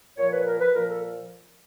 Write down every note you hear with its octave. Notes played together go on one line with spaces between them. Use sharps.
A#2 F3 C#5
B4
A#4
B4
A#2 F3 A#4
A4